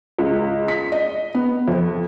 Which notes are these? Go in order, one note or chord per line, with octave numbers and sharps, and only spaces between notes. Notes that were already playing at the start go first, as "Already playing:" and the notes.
C#2
B6
D#5
B3
F2